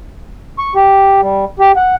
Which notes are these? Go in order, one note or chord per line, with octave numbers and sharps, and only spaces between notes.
C#6
G4
G3
G4
F#5